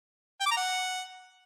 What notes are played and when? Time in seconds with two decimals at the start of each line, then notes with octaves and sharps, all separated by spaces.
0.41 G5
0.46 D6
0.52 A#5
0.57 F#5